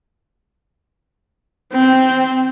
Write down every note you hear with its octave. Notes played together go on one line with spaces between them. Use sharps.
C4